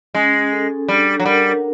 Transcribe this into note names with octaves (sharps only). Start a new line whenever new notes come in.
G#3 C#4
A4
G3 D4
F#3
G3 A#4